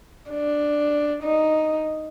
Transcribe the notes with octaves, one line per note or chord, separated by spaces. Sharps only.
D4
D#4